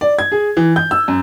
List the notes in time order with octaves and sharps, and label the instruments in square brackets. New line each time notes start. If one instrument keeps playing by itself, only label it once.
[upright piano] D5
G#6
G#4
E3
G6
E6
F#2